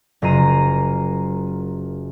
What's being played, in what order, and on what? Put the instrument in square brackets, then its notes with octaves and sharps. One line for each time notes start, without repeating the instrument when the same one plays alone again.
[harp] F#1 F4 A#4 A#5 C7 D#7